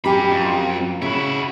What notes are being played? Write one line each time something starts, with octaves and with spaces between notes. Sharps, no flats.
F#2 D4 G4 B5
F2
C#3 E4 F#4